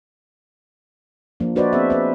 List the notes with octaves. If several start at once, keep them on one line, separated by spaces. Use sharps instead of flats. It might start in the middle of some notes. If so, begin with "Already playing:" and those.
F3 A#3 D4
D4 F#4 B4 C5 D5 D#5
B3 C4 G#4 C5 E5
G#4 B4 E5